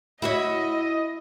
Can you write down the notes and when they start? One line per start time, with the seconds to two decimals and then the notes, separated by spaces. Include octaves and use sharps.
0.22 E4 F#4 C#5 D#5